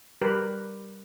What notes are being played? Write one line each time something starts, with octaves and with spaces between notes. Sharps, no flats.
G3 G4 A#4 B4